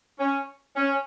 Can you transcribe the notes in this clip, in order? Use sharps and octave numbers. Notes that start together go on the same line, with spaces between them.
C#4
C#4